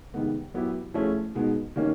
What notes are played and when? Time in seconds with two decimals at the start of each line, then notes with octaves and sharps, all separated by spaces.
0.14 C3 D#3 G#3 B3
0.54 F#3 B3 E4 G4
0.94 F3 A3 C#4 E4 G#4
1.35 B2 G#3 B3 D#4
1.76 D#3 G3 A#3 C#4